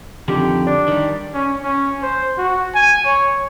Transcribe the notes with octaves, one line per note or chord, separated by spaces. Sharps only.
F2 D3 D#3 G4
D4
D#3 G3
C#4
C#4
C5
F#4
G#5
C#5